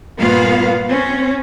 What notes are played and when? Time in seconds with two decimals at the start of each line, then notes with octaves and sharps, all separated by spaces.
0.19 G2 A#2 A#3 B3 F4 F5
0.88 C4 C#4